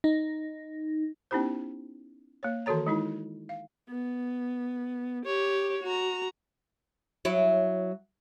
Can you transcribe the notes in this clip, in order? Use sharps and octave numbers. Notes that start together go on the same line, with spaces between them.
D#4
B3 C#4 D#4 E4 G4 C5
A#3 C#5
D#3 E3 F#4 A4 C#5 A#5
G#3 D#4 E4
F5
B3
G4 C#5
F#4 A#5
F#3 E4